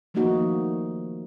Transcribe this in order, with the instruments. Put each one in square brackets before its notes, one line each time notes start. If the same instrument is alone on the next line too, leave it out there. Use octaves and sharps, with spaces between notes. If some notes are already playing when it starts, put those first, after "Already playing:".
[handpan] D#3 F3 A3 A#3 D#4 F#4